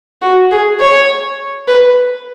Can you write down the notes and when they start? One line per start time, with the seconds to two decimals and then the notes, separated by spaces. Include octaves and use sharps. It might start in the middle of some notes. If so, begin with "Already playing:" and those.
0.22 F#4
0.51 G#4
0.80 C#5
1.68 B4